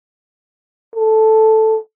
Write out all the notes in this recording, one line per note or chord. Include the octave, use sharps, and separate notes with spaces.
A4